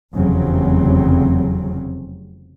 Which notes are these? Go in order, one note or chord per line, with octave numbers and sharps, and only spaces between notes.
F1 E2 C#3 F#3 C4